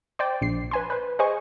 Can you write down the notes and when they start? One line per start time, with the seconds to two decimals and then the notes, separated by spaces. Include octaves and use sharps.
0.19 C5 D5 G5
0.41 A#1 C7
0.71 B4 G#5 C6
0.90 B4 C5
1.19 G#4 C5 D#5 G#5 C#6